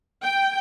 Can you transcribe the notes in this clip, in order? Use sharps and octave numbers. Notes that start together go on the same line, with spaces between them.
G5